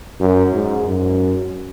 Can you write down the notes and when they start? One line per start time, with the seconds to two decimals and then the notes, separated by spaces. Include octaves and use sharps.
0.20 F#2
0.53 G#2
0.86 F#2